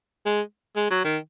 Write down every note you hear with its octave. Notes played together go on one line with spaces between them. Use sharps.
G#3
G#3
F#3
D#3